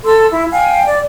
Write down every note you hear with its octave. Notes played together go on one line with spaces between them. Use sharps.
A4 C6 E6
E4
F5 G5 G#5
D5